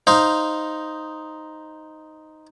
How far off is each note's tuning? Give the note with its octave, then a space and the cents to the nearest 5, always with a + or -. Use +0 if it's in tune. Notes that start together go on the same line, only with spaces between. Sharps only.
D#4 +0 C5 +0 F5 +0